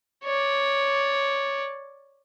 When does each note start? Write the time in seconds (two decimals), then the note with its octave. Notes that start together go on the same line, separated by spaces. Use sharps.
0.24 C#5 D5